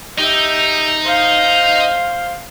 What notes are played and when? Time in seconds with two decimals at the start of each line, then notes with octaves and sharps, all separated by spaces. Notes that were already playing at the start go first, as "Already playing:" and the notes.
0.18 D#4 G4 E5
1.04 C5 F5